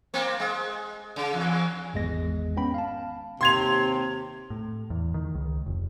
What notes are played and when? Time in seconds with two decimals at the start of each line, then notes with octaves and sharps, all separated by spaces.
0.14 A#3 C4
0.40 G#3
1.16 C#3
1.33 E2
1.94 G#1 E2 G#3 A#6
2.57 B3 C#4 G5 B5
2.74 F5 A5
3.41 D#2 C3 C6 G#6 F7
4.50 A2
4.90 E2
5.14 D#3
5.35 C#2
5.66 F1